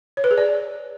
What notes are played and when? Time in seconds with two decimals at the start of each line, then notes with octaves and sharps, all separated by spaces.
0.17 C#5
0.24 B4
0.31 G#4
0.38 D5